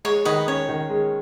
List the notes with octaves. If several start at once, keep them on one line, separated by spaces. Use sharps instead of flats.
G#3 C#5
D#3 B4 D#5
C#4 C#5
D#3
G#3